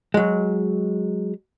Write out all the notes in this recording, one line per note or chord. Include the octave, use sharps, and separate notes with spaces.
F#3 G#3